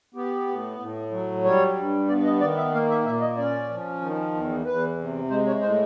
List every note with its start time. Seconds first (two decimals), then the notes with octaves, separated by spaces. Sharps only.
0.14 B3 G4
0.48 A2
0.79 A2
1.11 F#3
1.45 G3 C#5
1.77 G2
2.08 B3 D5
2.24 D#5
2.41 D#3 D5
2.57 E5
2.72 A#3 F5
2.90 E5
3.05 A#2 E5
3.21 D#5
3.37 C#4 D5
3.69 F3
4.01 D#3
4.34 E2
4.66 E2 B4
4.98 C3
5.30 G#3 C5
5.47 C#5
5.62 A2 C5